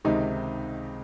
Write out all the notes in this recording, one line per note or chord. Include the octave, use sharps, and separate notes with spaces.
C#2 C3 D#3 G#3 D#4